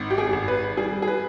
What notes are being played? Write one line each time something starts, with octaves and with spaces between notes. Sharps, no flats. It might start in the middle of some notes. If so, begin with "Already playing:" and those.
Already playing: G#1
G4
G#4
G#1
B4
G3 G#4
G#4
B4